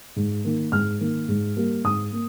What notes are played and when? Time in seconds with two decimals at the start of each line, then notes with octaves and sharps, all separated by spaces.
0.16 G#2
0.45 D#3 A#3
0.72 G#2 F6
1.01 D#3 A#3
1.28 G#2
1.57 G3 A#3
1.84 G#2 D#6
2.13 A#3